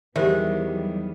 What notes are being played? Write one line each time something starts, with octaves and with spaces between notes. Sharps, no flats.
E2 D#3 F#3 G3 B3 G4 C5 E5